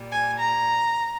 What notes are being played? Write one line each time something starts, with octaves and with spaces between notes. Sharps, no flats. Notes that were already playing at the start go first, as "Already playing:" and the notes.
Already playing: A#2 G3
G#5
A#5